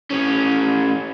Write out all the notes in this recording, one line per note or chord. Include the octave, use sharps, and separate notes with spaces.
A2 C#4